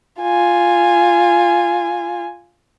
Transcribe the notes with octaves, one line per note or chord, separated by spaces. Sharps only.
F4 G#5